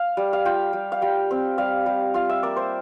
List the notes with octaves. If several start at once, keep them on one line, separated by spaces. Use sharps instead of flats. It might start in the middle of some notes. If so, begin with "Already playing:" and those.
Already playing: F5
G3
F5
F4 G5
G3
F5
G3 G5
C4
G3 F5
G3
F4 F5
E5
A#3 D5
C5